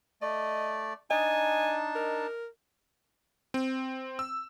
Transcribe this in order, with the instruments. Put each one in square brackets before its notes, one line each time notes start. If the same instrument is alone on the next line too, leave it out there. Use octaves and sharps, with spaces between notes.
[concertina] A3 D5 [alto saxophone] D#5
[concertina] D4 D#4 A5 [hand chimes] D#5 [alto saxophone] G#5
[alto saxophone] A#4
[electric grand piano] C4
E6